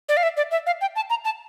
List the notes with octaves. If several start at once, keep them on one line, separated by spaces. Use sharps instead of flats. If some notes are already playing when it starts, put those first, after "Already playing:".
D5
F5
E5
D5
E5
F5
G5
A5
A#5
A5